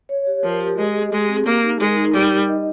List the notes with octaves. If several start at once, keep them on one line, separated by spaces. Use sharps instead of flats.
C#5
G4
F3 A#4
G4
G#3 D#5
G#4
G#3 G4
C4
A#3 G4
D#4
G#3 A#4
D#4
G3 G4
D#4
D#5